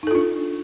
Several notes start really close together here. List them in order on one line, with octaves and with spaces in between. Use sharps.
D#4 A4 F4 D4